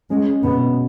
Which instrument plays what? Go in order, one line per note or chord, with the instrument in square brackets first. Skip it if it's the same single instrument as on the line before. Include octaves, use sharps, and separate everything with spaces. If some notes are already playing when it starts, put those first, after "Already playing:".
[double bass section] G#3 [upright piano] C#4
[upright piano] B2 [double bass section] B3